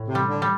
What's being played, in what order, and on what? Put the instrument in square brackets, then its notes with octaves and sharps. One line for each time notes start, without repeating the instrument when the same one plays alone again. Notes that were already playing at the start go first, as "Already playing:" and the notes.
Already playing: [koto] A2
[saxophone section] C3
[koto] G3
[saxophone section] D3
[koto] G3